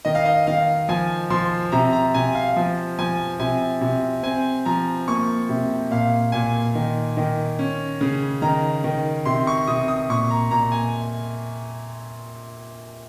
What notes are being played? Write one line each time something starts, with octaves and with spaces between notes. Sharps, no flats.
D#3 D#5
F5
D#5
D#3 F5
F3 G#5
F3 C6
C3 A#5
A#5
C3 G#5
F5
F3
F3 G#5
C3 G#5
C3
C4 G#5
F3 A#5
A#3 C#6
C3
A#2 F5
A#2 G#5
D#3
D#3
C#4
C#3
D#3 A#5
D#3
C3 C6
C#6
C3 D#6
D#6
A#2 C#6
A#5
A#2 A#5
G#5